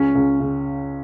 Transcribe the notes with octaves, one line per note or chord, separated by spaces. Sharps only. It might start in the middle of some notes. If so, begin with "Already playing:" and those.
Already playing: C#2 C#4
C#2
C#3